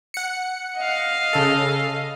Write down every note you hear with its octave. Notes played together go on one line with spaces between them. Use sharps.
F#5 C#7
D#5 F5
C#3 A4